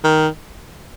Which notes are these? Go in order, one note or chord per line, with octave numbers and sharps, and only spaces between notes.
D#3